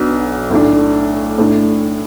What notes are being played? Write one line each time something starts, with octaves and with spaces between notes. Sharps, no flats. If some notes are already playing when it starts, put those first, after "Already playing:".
Already playing: B1 B2 B3 D4
B1 A2 A3 D4
A2 A3 D4